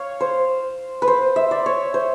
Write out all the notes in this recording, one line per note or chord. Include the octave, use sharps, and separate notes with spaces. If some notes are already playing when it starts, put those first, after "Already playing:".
Already playing: C#5 F5
C5
B4
C5
E5
D5
C#5
C5